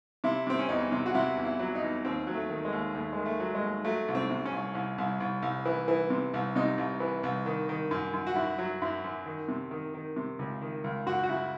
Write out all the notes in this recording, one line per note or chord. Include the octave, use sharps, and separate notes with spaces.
C3 E4
C3 C4
C#4
E2 D#4
C3
F#4
C3 E4
E2
E4
F#3
D#4
E2
D#2 C4
F#3
A3
D#3
G#3
D#2
D#2 A3
D#3 G#3
A3
F#3
G#3
D#2
F#3 A3
C2
C4
C3
C#4
C2
C2
C2
C2
C2
E3
E3
C3
C2
C3 D#4
C2
E3
C2
D#3
D#3
F#2
F#2
F#4
F#2 E4
F#3
F#2 E4
F#2
D#3
C3
D#3
D#3
C3
C#2
D#3
C#2
F#2 F#4
F#4
C#3 E4